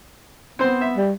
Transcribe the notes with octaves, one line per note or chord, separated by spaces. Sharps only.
B3 C4 C5
E5
G3